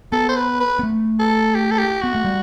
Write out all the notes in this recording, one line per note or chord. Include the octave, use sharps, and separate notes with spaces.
B3 A4
C5
B4
B4
B3
A3
A4
G4
A4
G4
B3 F#4
A3
G3